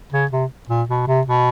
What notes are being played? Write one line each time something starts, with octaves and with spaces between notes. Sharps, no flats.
C#3
C3
A#2
B2
C3
B2